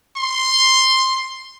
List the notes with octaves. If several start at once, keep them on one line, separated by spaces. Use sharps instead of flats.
C6